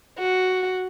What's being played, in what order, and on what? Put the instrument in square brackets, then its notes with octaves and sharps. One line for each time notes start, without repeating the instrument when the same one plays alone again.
[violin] F#4